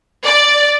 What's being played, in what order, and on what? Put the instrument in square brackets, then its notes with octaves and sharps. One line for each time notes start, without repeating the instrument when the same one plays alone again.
[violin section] D5